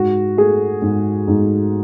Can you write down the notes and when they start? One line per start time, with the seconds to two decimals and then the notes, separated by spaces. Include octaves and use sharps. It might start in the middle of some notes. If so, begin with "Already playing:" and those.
Already playing: G#2 F#4
0.37 A3 G#4
0.82 G#2
1.28 G#2